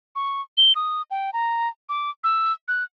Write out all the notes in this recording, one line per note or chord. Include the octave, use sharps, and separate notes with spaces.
C#6
G7
D#6
G5
A#5
D6
E6
F#6